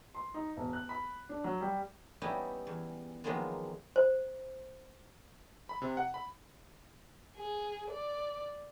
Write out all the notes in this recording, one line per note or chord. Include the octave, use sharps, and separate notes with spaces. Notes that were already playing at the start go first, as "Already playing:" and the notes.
C6
D#4
E1
F#6
B5
D4
F#3
G3
G3 B3 C#4 D#4 E4 G4
E2
D#3 F3 F#3 G#3 A#3 B3
C5
B5
C3
F#5
B5
G#4
D5